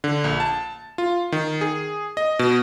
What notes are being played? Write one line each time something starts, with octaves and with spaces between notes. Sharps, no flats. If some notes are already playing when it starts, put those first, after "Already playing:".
D3
A#1
A5
F4
D#3
G#4
D#5
B2